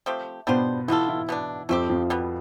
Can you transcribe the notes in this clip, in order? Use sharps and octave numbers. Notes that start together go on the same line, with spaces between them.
F3 A3 C4 G4
B2 G3 B3 D4 F4 C5
B2 E3 B3 E4 F4 A4
E3 E4
B2 B3 D4
F2 F3 A3 C4 G4
F2 F3
B2 G3 B3